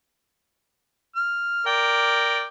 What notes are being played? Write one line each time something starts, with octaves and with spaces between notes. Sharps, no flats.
F6
A#4 D5 G5